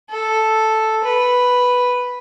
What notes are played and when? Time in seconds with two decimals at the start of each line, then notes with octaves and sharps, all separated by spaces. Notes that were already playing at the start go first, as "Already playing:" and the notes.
0.10 A4
1.04 B4